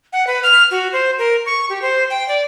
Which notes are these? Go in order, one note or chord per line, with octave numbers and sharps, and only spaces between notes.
F#5
B4
F6
F#4
C5
A#4
C#6
G4
C5
G5
D5